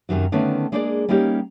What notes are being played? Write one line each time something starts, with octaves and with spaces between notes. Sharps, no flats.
F#2 C3 D#3 F#3
D3 D#3 A3 B3 C#4
G#3 A#3 D4 G#4 C#5 D5
G3 A#3 C#4 D#4 G4